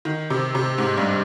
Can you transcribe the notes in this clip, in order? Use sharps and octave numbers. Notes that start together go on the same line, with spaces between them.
D#3
C3
C3
G#2
G2